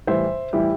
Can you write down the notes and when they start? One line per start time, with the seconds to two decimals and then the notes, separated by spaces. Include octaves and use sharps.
0.07 A2 E3 G3 C5 E5
0.53 A2 E3 G3 E4 G4